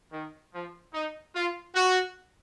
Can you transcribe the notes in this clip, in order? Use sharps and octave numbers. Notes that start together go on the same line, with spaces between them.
D#3
F3
D#4
F4
F#4